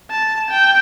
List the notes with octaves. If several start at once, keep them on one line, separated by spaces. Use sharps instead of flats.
A5
G5